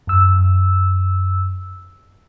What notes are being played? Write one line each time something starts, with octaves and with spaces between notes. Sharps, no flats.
F#2 E6